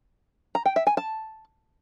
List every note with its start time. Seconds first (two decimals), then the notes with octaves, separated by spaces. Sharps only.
0.55 A#5
0.66 G5
0.76 E5
0.87 G#5
0.97 A5